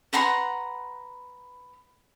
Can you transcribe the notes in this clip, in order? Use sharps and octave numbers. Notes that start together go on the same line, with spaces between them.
B4 F#5 A#5 C6